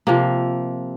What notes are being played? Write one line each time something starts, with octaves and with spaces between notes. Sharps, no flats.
C3 F3 A#3